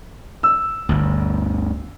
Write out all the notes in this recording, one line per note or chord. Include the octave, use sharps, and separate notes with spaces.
E6
G1 D2